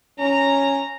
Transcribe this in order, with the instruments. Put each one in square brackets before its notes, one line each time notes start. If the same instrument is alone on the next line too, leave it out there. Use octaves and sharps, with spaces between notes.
[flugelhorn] C#4 [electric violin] A#5